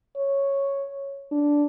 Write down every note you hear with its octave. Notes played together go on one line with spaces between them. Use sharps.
C#5
D4